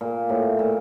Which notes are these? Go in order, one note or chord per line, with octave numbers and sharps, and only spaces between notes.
A#2
A2
A#2